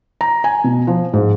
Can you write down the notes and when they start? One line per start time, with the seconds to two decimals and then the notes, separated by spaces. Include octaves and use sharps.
0.21 A#5
0.44 G#5
0.64 B2
0.87 F3
1.13 G#2